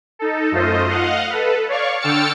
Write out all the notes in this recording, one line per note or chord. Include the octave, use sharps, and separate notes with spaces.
D#4 A4
F#2 A3 F4 C5 D#5
D#5 F5 F#5
A4 B4
C#5 D5 F5 C#6
D3 G5 E6 F6 A6 C#7